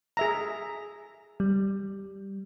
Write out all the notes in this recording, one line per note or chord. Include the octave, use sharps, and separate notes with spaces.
G#4 E5 A#5
G3